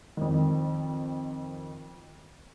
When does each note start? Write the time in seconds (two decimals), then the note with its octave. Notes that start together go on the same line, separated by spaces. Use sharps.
0.17 F2 D#3